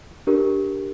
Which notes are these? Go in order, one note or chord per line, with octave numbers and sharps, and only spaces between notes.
D4 G4 A#4